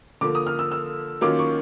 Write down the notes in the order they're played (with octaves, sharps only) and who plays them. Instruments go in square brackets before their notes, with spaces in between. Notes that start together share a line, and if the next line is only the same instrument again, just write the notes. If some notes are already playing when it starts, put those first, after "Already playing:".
[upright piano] D3 F3 A#3 D6
D#6
F6
E6
E6
D#3 F#3 A#3 C#4 F4 D6
C#6